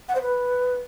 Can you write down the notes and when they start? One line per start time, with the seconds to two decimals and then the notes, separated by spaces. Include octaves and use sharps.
0.09 F#5
0.15 C5
0.22 B4